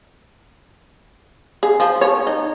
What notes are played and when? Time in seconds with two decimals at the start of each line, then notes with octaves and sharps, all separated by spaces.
1.63 G#4
1.80 F3
2.01 C#5
2.27 D#4